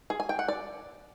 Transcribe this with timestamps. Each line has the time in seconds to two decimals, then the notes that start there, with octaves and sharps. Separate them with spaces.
0.10 G#4
0.20 G#5
0.29 G5
0.39 F#5
0.48 D5